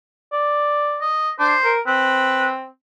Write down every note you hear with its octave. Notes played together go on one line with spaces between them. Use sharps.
D5
D#5
D4 C5
A#4
C4 B4